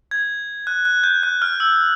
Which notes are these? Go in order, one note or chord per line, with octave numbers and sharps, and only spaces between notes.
G#6
F#6
F#6
G6
F#6
F6
E6